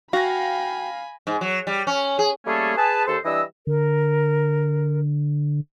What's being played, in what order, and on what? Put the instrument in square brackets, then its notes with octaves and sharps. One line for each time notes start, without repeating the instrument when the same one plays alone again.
[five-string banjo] F#4 [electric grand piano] F5 A#6 [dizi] G5 [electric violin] G#5 B5
[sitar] G#2
F#3
G3
C#4
G#4
[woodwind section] G3 A3 A#3 C#4 G#4 A4
G#4 B4 A5
D#2 A4 C5
E3 G3 D4 D#5 E6
[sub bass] D3 [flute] A#4